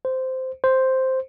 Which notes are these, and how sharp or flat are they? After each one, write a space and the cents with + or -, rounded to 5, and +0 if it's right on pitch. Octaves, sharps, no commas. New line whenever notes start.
C5 -10
C5 +0